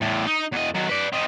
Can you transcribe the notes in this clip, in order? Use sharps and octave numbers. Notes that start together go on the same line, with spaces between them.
E2 A2
D#4
E2 D#5
D#3 F#3
B4 D5
C4 D#4